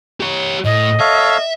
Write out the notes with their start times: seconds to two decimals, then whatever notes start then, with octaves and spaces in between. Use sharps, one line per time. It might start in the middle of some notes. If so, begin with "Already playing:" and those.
0.21 G4 C#5
0.65 A2 D#5
1.00 A4 C#5 E5 F5